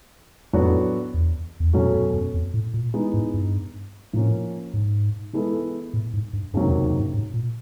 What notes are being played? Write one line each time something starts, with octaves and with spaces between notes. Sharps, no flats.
F2 A2 F#3 B3 D4 F#4
E2
E2
F2 B2 F#3 A3 C#4 F#4
F#2
F#2
F2
A2
A#2
E3 G#3 B3 D#4
G#2
G2
A2 F3 A#3 C#4
G#2
E3 G#3 B3 E4 A4
A2
G#2
G2
C#2 F#2 C3 D#3 F#3 A#3
F2
F2
G2
G#2
A#2